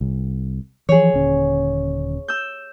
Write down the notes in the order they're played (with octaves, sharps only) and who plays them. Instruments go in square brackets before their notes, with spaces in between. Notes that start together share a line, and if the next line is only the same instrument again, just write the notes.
[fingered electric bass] C2
[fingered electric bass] E3 F3 [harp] G#4 C#5
[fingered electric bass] D#1 D3 C#4
[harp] E6 G6